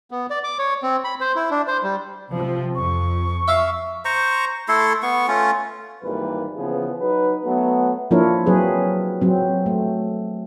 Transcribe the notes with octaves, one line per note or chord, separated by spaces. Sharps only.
B3
D5
D6
C#5
C4
B5
C5
E4
D4
C5
G3
C3 F3 C4
F2 C#6
E5 F5
C5 A#5 C#6
A3 E4 A4 C6
B3 C#6
A3 C#4 F4
G#1 E3 G3 A#3 B4
C#3 E3 F3 B3 G#4
F#3 D#4 B4
F#3 A3 B3
F3 A#3 D4 E4 A#4 C#5
F#3 C4 G#4 B4
F#3 C4
A3